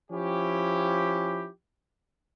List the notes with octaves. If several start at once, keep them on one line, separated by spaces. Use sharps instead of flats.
F3 C#4 E4 G4